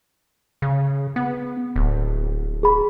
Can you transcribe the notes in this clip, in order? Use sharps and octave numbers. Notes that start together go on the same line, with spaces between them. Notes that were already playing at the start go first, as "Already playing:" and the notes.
C#3
B3
D1
G#4 B5